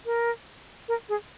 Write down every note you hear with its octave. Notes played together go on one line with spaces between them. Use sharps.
A#4
A#4
G#4